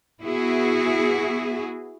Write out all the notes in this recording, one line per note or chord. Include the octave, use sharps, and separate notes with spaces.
B3 E4 F#4 G#4